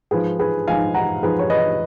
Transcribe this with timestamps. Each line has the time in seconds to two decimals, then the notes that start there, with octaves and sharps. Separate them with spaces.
0.11 G#2 F3 G#4 B4
0.39 G#4 B4
0.68 G#2 F3 F5 G#5
0.94 F#5 A#5
1.22 G#2 F3 G#4 B4
1.39 C#5
1.50 B4 D#5